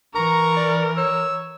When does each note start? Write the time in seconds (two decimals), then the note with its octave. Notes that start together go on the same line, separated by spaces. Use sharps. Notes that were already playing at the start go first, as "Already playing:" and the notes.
0.15 E3 A#4 A#5 C#6
0.56 D5
0.97 C#5 E6